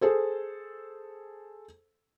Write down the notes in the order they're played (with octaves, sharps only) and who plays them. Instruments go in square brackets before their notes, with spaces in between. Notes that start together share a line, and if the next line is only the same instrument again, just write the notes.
[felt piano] G#4 A4 C5